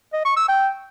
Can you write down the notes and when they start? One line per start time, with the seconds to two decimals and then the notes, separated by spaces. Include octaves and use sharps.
0.13 D#5
0.25 C#6
0.37 E6
0.48 G5